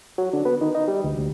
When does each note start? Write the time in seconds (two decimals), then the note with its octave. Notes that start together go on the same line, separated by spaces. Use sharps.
0.18 F#3
0.33 D3
0.45 B3
0.61 D#3
0.75 D#4
0.88 G3
1.04 D2
1.18 D2